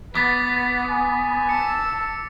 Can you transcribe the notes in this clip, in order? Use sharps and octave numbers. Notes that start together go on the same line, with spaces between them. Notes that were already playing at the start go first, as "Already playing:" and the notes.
B3 B4 F#5 D6 A6 B6
G#5
A5 E6 C#7